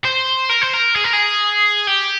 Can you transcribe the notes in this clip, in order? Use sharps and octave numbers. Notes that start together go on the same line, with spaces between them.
C5
A#4
C5
A#4
G#4
A#4
G#4
G4